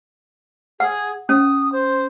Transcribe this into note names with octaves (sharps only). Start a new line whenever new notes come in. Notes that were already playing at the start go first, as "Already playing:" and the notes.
G#4 F#5
C#4 D#6
C5